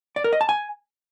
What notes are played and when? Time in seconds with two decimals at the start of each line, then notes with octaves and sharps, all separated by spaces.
0.16 D5
0.24 A#4
0.33 D#5
0.41 A5
0.49 G#5